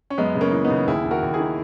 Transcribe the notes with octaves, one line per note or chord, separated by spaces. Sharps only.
C#4
F#2 G#3 B3
C#3
A#3 C#4
E3
B3 D#4
C#3
D#2 E4 G#4
D#2
F#4 A#4
D#2
E4 G#4
D#3